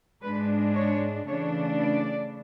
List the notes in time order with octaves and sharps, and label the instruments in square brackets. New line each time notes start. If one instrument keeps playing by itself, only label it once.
[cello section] G#2 G#3 D4 B4
C#5
C#3 E3 A3 D4 C#5
D5